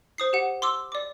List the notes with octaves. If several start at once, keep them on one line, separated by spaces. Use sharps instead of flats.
C5 D#6 C7
G4 F#5
C6 D6 E6
D5 D6